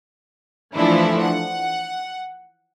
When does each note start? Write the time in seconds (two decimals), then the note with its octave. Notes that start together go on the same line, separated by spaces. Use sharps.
0.75 E3 F3 A3 D4 E4
1.23 F#5